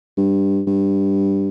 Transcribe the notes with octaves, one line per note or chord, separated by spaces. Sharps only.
G2
G2